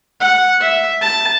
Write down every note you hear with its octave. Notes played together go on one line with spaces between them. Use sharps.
F#5
E5
A5